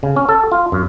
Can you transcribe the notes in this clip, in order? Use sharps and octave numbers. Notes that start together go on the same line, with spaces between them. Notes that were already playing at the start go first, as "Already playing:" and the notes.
C#3
C#4
A4
F4
F#2